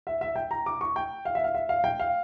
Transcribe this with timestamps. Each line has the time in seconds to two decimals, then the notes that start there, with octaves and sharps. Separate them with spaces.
0.07 E5
0.21 E5
0.36 G5
0.51 A#5
0.66 D6
0.81 C#6
0.96 G5
1.25 F5
1.35 E5
1.44 F5
1.54 E5
1.69 F5
1.84 G5
2.00 F5